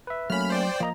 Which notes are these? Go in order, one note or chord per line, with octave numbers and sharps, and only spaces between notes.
B4 E5
F#3 A3 A#3 C#4 B5 F6
C5 D5 G5
F3 A#3 D#5 A#5